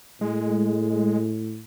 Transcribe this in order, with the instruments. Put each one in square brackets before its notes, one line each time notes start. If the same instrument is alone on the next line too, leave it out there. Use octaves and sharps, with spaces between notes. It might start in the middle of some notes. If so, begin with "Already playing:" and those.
[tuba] A2 [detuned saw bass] G#3